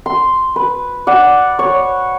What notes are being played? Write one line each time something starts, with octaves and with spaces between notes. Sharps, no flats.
C6
B4
D5 F#5
C#5